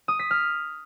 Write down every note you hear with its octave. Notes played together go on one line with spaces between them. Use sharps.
D#6
B6
F6